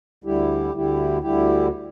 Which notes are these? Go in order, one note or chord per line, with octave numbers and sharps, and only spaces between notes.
D2 D3 G3 E4 G4
D2 D3 G3 E4 G4
D2 D3 G3 E4 G4